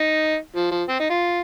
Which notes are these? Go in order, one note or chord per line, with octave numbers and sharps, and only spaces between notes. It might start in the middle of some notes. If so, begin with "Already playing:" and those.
Already playing: D#4
F3
F3
C4
D#4
F4